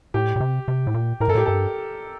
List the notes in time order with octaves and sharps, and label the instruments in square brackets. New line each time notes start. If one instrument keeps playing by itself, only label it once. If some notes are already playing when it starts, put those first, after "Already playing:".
[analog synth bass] A2 [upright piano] G4
[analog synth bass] A#2
C3
C3
A2
A#2
[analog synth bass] A2 [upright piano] A#4
[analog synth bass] G2 [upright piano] A4
[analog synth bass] A2 [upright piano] G4
[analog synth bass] G2 [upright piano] A4